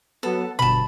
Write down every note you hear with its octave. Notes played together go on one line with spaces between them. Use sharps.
F#3 B3 A4
G1 B2 A5 B5